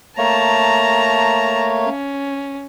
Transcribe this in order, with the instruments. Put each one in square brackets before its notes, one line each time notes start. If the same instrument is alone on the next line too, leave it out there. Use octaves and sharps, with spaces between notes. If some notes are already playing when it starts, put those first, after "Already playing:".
[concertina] A3 A#3 C#5 [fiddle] A5 A#5
[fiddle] C#4